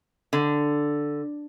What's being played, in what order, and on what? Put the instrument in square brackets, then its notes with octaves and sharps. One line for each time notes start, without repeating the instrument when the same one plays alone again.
[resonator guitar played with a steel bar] D3